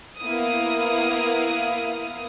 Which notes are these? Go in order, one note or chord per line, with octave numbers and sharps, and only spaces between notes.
A#3 B3 E4 F5 D#6